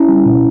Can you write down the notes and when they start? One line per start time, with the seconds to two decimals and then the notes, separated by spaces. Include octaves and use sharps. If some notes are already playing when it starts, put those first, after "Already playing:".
Already playing: C#4 E4
0.08 G3
0.26 B2